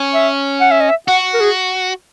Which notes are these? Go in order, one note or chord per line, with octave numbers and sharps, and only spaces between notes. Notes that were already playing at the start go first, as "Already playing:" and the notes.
Already playing: C#4
E5
F#5
E5
D#5
E5
F#4 F#5
A#4
G#4